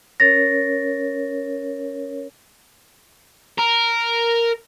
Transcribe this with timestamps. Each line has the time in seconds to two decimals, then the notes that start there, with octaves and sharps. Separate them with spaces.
0.20 C#4 A#4 C#5 A6 A#6
3.58 A#4